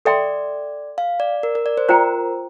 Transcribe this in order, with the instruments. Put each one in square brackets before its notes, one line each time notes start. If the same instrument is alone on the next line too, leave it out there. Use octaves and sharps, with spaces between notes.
[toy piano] A4 E5 G5 C6 [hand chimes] D5
[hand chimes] F5
D5
A#4
A#4
D5
C5
[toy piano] F4 C5 G5 A#5 [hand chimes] A#4